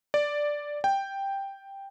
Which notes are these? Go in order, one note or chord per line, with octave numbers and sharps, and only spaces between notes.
D5
G5